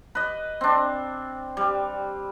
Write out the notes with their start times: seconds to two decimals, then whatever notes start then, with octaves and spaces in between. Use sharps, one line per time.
0.15 B4 D#5
0.61 C4 D4
1.57 G3